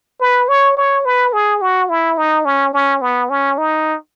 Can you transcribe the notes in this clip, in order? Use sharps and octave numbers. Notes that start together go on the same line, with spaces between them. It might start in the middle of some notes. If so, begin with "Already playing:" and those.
B4
C#5
C#5
B4
G#4
F#4
E4
D#4
C#4
C#4
B3
C#4
D#4